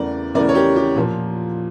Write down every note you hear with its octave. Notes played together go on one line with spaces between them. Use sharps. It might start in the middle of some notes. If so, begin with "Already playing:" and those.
Already playing: E2 C#3 E3 A3 A#4 D5
E2 C#3 E3 A3 A#4 D5
C#5
G4 A#4
G4
A#2 F3 A#3